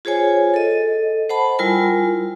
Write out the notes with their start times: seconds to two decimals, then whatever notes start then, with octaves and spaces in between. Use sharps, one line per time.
0.05 F4 G#4 C5 C#5 G#5
0.54 A4 D#5
1.29 C5 F#5 A5 B5
1.59 G3 E4 F4 A#4 G#5